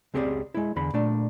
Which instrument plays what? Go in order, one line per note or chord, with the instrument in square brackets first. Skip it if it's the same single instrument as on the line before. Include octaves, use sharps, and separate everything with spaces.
[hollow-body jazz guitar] C#2 C4 G4 G#4 B4 D5
G#3 E4
E2 D3 B5
A#2 A3 D4